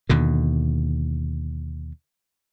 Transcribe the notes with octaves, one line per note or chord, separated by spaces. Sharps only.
D#2 B2 D3